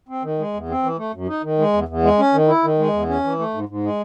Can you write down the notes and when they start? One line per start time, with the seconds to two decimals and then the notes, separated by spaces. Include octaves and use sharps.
0.09 C4
0.23 D#3
0.39 G#3
0.54 E2
0.69 C4
0.83 E3
0.98 A3
1.14 F#2
1.29 D#4
1.43 D#3
1.58 G#3
1.73 E2
1.88 E2
2.03 G#3
2.19 C#4
2.34 D#3
2.48 E4
2.64 D#3
2.79 G#3
2.94 E2
3.09 C#4
3.24 E3
3.39 A3
3.54 G#2
3.69 G#2
3.83 G#3